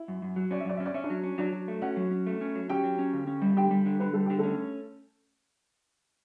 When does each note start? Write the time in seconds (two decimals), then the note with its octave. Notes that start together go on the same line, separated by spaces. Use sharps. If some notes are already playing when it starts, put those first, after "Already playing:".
Already playing: E4 E5
0.08 F#2
0.22 F#2
0.36 F#3
0.51 C#4 D5
0.60 E5
0.65 F#2 D5
0.77 C#4 E5
0.86 D5
0.94 C#4 E5
1.04 D4 D5
1.10 F#3
1.23 C#4
1.38 F#3 D4 D5
1.53 F#3
1.68 A3
1.82 C#4 F#4 F#5
1.97 F#3
2.11 C#4
2.26 A3
2.41 C#4
2.55 F#3
2.70 C#4 G4 G5
2.83 F#3
2.99 C#4
3.13 D3
3.27 C#4
3.42 G3
3.57 D3 G4 G5
3.71 G3
3.86 D3
4.00 D3 B4
4.13 G3 A4
4.26 D3 G4
4.39 A3 C#4 A4